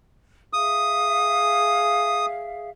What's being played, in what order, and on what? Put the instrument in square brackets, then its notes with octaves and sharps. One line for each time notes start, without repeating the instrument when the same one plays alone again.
[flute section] G#4 E5 F5 [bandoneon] D#6